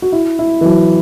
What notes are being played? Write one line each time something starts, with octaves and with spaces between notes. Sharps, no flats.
F#4
E4
E4
E3
F#3